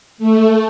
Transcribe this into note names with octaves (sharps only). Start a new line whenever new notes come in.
A3